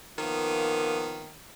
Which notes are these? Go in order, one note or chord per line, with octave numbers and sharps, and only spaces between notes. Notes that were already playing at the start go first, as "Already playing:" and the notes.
D#3 F3 A#3 B3